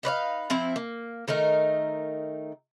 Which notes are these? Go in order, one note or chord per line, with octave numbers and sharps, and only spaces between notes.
D#4 B4 C#5 F5
F3 C4 E4
A#3
D#3 A3 D#4 A#4